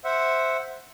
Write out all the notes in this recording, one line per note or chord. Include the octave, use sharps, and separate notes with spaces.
C5 E5 F#5